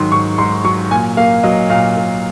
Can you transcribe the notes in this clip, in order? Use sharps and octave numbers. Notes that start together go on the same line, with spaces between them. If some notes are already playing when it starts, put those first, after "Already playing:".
Already playing: G#2 D#3 F#3 C6
G#2 C#6
G#2 C6
F#3 C#6
A#2 G#5
A#3 F5
F#3 D#5
A#2 F5
A#2